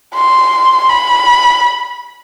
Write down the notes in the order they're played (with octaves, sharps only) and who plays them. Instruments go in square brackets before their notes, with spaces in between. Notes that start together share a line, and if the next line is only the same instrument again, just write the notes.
[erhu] C6
B5